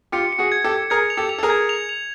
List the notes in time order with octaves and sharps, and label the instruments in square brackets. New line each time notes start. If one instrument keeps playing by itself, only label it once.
[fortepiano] F4 G4 [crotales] C#7
[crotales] C#7
[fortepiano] F#4 G#4
[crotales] G#6
[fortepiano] G4 A4
[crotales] G#6
[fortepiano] G#4 A#4 [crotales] G#6
[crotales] F7
[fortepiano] G4 A4
[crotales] F7
[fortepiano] A4
G#4 A#4
[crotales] G#6
F7
F7